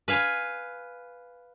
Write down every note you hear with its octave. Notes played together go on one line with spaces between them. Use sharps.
B4 F5 G#5